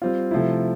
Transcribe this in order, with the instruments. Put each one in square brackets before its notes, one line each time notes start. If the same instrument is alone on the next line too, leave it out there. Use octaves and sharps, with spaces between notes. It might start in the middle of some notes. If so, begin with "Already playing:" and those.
[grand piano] G3 C4 F4
C3 F3 A3 E4